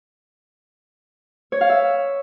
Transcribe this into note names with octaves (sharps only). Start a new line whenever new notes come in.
C#5
F5
E5